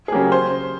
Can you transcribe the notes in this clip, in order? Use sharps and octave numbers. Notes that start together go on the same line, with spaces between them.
G#4
C#3 F#3 A#3 G4
C5